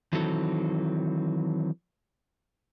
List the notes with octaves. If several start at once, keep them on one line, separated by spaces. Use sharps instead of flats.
D#3 E3 F#3 C4 A4